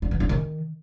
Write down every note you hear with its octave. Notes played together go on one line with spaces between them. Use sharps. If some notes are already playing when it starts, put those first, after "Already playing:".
D4
E3
D4
D#3